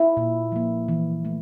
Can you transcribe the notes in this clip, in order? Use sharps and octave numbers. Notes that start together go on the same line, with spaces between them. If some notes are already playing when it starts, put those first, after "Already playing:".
Already playing: E4
A#2
F3 A#3
E3
A3